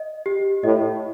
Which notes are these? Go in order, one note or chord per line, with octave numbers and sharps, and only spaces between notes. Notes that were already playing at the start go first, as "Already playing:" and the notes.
Already playing: D#5
G4
A2 D#5